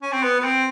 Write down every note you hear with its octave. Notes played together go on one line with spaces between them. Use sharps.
C#4
C4
B3
B3
C4